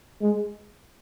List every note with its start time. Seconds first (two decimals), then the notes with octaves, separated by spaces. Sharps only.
0.21 G#3